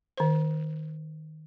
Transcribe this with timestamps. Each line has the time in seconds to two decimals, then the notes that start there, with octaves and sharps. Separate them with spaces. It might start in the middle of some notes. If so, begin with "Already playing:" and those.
0.17 D#3 C5